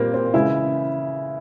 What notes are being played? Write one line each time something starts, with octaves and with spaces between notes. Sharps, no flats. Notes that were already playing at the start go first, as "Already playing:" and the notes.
Already playing: A#2 G3 A#3 C4
C4
C#3 E3 G#3 E4